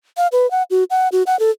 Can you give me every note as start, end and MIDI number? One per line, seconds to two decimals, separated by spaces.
0.17 0.27 77
0.32 0.49 71
0.51 0.63 78
0.70 0.84 66
0.90 1.08 78
1.12 1.23 66
1.27 1.38 78
1.39 1.50 69